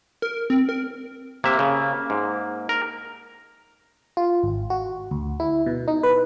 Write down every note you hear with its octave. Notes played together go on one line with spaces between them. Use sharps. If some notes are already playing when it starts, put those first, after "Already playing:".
A#4
C4
A#4
C3 A#3 E5
C#3
G#2
A#4
F4
G#1
F#4
D2
E4
B2
D#4
B4